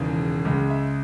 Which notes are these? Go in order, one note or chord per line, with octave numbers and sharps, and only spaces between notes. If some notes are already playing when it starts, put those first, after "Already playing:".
Already playing: E1 D#2 C#3 E3
C#2 C#3 G#3
E5